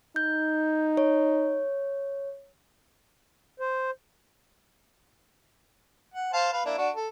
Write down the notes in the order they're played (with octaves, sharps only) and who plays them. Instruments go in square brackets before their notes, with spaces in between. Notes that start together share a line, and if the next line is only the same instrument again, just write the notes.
[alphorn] D#4 [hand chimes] G6
[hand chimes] C#5
[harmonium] C5
[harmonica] F#5
C5 F5 A5
B4 F5
A#3 D4 E4
D4 F#4
A4